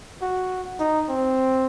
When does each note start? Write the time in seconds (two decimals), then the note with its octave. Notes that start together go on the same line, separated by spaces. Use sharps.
0.22 F#4
0.80 D#4
1.09 C4